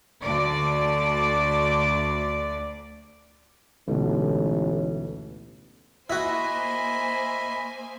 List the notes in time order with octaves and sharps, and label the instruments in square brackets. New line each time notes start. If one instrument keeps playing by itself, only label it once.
[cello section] D2 D5
[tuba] A1 [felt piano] D2 G#2 B2
[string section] A#3 C5 G#5 [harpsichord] E4 F#4 [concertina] D#5 E5 B5